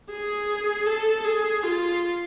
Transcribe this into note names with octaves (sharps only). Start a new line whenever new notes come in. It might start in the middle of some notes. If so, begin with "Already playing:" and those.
G#4
A4
G#4
F4